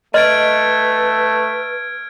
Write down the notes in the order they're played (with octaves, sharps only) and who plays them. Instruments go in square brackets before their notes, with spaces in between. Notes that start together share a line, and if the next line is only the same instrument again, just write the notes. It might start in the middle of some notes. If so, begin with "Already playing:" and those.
[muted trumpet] A3 [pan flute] B4 [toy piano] D#5 C6 [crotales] F6 G#6 D7